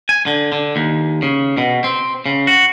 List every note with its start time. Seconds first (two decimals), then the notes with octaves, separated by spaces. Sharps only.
0.09 G#5
0.26 D3
0.52 D3
0.76 D#2
1.22 C#3
1.58 B2
1.84 C4
2.26 C#3
2.47 F#4